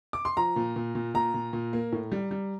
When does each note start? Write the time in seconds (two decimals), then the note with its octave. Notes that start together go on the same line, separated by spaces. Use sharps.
0.13 D6
0.25 C6
0.37 F3 A#5
0.56 A#2
0.76 A#2
0.95 A#2
1.14 A#2 A#5
1.34 A#2
1.53 A#2
1.73 A#3
1.92 A2
2.12 G3
2.31 G3